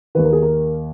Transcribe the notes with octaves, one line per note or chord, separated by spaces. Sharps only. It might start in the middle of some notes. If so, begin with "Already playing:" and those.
D#2 D#3 B4
A#4
G#4
A#4